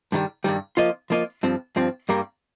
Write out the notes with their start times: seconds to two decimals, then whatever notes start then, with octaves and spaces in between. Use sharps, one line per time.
0.12 G2 D#3 G3
0.44 G2 D#3 G3
0.77 F3 A#3 F4 D#5
1.10 F3 A#3 F4 D#5
1.43 G2 F3 C4
1.76 G2 F3 C4
2.09 G2 G3 A#3